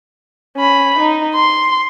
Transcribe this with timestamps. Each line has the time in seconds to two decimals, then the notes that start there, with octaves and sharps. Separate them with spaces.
0.57 C#4 B5
0.99 D#4
1.35 C6